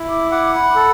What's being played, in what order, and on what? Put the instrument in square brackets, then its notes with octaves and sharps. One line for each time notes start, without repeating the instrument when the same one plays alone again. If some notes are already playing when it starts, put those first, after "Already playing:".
Already playing: [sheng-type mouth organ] E4
[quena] D6
[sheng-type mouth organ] F#5 [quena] D6
[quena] B5
[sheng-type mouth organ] A4